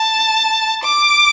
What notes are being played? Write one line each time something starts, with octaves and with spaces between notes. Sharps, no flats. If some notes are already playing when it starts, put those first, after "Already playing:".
Already playing: A5
D6